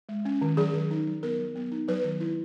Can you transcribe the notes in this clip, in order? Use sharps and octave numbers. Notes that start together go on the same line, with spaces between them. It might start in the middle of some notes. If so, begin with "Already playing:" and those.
G#3
C#4
D#3
F#3 G#4
D#3
D#4
F#3
B3 A#4
F#3
B3
D#4
F#3 B4
D#3
E4